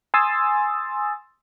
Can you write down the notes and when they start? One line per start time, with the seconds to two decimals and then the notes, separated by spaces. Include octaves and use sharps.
0.14 G#5 C6 D#6 E6 A6